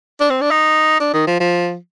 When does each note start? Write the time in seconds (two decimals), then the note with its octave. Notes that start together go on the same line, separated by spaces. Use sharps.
0.20 D4
0.30 C4
0.41 D4
0.51 D#4
1.00 D4
1.14 D#3
1.27 F3
1.40 F3